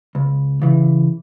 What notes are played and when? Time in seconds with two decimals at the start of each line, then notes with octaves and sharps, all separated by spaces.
0.15 C#2
0.62 C#3 E3